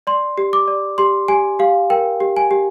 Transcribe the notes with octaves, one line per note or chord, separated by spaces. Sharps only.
D5 C6
G4
D6
D5
G4 C6
G4 G#5
G4 F5
A#4 G5
G4
G#5
G4